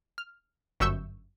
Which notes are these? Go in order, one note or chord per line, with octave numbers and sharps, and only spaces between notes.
F6
G1 F#2 E5 C#6 E6 G6